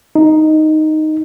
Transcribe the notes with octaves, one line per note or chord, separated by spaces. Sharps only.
D#4